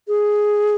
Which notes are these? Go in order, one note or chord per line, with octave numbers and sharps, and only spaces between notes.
G#4